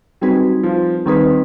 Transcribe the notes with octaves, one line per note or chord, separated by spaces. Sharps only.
F#3 G3 C4 D#4 G#4 B4
F3
D#3 G3 C4 D#4 G#4 B4